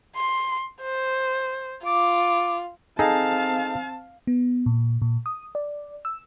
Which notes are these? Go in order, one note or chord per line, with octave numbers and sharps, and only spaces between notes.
C6
C5
F4 D6
C4 D#4 G#4 A4 F5 A5
B3
A#2
A#2
D#6
D5
E6